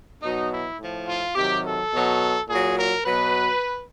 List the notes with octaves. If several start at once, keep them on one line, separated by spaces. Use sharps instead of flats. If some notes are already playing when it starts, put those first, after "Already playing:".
B2 F#3 D#4
E4
A2 F3
F4
C3 D#3 F#3 G4
A4
B2 F#3
A#2 F#3 G#4
A#4
B2 F#3 B4